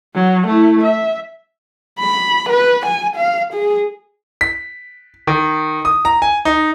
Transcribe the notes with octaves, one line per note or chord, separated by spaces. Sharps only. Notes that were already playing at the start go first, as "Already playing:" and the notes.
F#3
A3 E4
E5
B5
B4
G#5
F5
G#4
B6
D#3
D#6
A#5
G#5
D#4